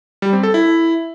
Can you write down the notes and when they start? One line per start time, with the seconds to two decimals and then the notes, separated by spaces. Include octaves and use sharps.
0.22 G3
0.33 C4
0.43 A4
0.54 E4